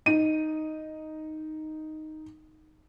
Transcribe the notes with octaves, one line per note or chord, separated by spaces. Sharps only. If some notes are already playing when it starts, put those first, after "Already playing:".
D#4 D#7